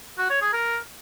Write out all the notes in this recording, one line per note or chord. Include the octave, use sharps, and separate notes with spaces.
F#4
C#5
G#4
A#4